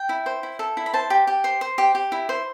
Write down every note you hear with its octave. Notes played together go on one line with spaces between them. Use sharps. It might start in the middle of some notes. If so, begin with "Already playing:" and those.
Already playing: G5
E4
C5
E4
A4
E4
B5
C5 A5
G4
G4
C5 C6
C5
G4
G4
E4
C5